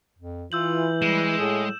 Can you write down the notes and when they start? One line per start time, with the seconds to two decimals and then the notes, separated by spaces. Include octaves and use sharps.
0.18 F2
0.52 E3 F4 E6 G6 F#7
1.02 G3 G#3 E7
1.38 A2 G#4